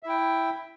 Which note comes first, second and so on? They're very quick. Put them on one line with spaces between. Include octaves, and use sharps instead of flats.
E5 E4 G5